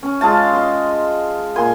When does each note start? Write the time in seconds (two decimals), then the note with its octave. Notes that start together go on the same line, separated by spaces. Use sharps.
0.03 C#4
0.21 G#3 F4 F5 A5
0.53 D#5 C6
1.56 A#2 G#5 C6